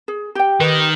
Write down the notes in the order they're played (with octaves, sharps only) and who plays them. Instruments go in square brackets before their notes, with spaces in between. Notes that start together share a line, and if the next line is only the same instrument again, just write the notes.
[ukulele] G#4
G4 G5
[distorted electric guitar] D#3 [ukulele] G4 B4